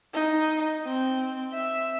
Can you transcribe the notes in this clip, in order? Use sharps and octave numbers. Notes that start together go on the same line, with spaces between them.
D#4
C4
E5